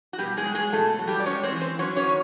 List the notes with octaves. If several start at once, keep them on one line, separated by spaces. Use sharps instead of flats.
F#4
B2 G3 G4
G#3 G#4
F#3
G#3 G#4
B2 A3 A4
F#3
G3 G4
D5
G#3 C#4 C#5
C4 C5
E3
C4 C5
F#3 C#4 C#5
C#4 C#5
D#3